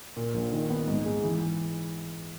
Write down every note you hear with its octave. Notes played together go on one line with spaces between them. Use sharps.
A#2
A#1
D#3
B3
G#2
G#3
E3